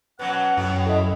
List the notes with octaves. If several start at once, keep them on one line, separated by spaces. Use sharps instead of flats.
B2 F#3 B3 C#4 F#5
F#2 A2 F#3
E4 A4 D#5